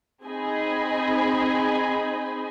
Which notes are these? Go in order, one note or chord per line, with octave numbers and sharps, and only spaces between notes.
C4 D#4 G#4 D#5 G#5 B5